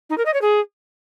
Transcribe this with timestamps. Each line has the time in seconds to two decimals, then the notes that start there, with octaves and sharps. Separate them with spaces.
0.10 D#4
0.18 A#4
0.26 D#5
0.34 C#5
0.42 G#4